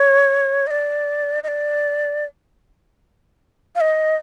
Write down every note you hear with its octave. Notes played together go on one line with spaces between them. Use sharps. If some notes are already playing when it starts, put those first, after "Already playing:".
Already playing: C#5
D#5
D5
D#5
D5
F5
D#5